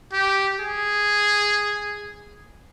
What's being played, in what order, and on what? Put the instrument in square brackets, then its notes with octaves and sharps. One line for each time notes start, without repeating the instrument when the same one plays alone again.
[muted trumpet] G4
G#4